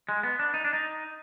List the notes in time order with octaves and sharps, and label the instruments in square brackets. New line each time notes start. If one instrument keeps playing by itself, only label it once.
[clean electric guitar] G#3
B3
D4
D#4
D4
D#4